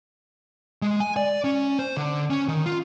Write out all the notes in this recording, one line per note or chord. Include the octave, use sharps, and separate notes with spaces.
G#3
G#5
D5
C#4
C5
D3
C#4
D#3
F4